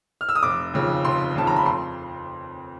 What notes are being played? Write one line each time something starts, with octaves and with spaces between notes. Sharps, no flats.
F6
E6
D#6
F1 D6
D#2 C#3 F3
F1 C6
D#2 C#3 F3 A5
A#5
B5
F2 C6